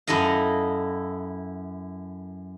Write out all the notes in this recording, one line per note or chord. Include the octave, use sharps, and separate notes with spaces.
F#2 E4 A4 D#5 F5